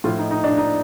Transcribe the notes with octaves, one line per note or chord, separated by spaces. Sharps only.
A2 F3 F4
D#4
D#4
D4
D#4